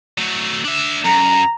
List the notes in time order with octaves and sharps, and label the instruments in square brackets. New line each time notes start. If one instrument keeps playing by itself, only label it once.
[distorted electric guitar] F#3 A3
D4 E5
[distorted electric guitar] F#2 [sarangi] A#5